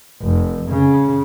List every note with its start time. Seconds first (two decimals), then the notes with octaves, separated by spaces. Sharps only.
0.22 F1
0.70 C#3